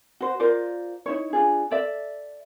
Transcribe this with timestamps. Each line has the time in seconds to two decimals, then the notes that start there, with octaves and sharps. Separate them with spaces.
0.20 F#4 C5
0.40 F4 A#4 C5 D5
1.06 D#4 E4 C#5
1.33 D4 F4 G#4
1.71 A4 D5 E5